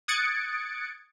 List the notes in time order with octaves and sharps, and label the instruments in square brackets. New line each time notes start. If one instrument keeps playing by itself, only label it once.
[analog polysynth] D#6 F#6 G#6 A6 C#7 D7